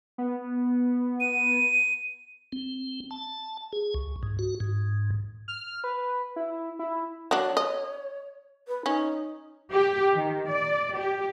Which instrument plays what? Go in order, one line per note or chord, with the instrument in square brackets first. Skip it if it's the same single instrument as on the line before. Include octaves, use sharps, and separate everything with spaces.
[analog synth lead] B3
[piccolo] D#7
[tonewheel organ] C4
A5
G#4
C#2
G#2
F#4
G#2
[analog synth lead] F6
B4
E4
E4
[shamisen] F#3 D4 [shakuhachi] C#5
[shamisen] D#5
[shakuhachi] B4
[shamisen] C#4 [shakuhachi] D#4
[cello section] G4
D#3
D5
G4